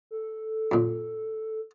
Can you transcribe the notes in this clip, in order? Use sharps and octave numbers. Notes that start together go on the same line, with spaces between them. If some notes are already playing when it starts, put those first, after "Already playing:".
A4
F#2 A#2